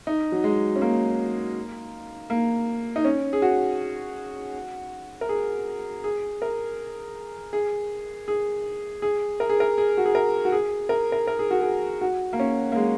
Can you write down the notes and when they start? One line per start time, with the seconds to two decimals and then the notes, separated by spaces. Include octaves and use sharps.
0.07 D#4
0.32 F#3
0.44 G#3
0.76 C#4
0.82 A#3
2.30 A#3
2.96 D#4
3.05 C#4
3.33 G#4
3.42 F#4
5.21 A#4
5.29 G#4
6.04 G#4
6.42 A#4
7.53 G#4
8.28 G#4
9.02 G#4
9.40 A#4
9.49 G#4
9.60 A#4
9.78 G#4
9.98 F#4
10.06 G#4
10.15 A#4
10.45 F#4
10.52 G#4
10.89 A#4
11.12 A#4
11.27 A#4
11.39 G#4
11.51 F#4
11.62 G#4
12.01 F#4
12.33 A#3
12.40 C#4
12.72 A#3
12.76 G#3